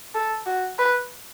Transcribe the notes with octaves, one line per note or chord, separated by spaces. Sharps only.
A4
F#4
B4